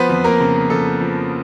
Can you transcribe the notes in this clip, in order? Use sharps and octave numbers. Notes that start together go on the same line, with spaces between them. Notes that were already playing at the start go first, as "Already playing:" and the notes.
Already playing: F3 B3 B4 C5
F2
A#3 A#4
C#3
F2 A4
F3